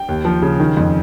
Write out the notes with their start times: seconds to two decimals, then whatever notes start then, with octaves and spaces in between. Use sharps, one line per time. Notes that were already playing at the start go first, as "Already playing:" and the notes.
Already playing: G5
0.08 D#2
0.25 F3
0.42 C#3
0.60 D#3
0.77 F2